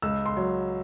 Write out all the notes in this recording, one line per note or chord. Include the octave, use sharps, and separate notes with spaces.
C#2 E6
C6
F#3